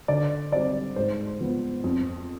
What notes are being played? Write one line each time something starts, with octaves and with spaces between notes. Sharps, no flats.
D3 D5
G3 C4 D5
G#2 C5
F3 B3
F2